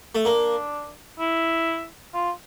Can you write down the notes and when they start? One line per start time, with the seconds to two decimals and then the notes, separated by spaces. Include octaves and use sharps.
0.15 A3
0.24 A#3 D4
1.20 E4
2.14 F4